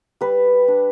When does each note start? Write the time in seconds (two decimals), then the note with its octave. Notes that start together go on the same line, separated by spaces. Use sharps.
0.21 G3 B4
0.68 D4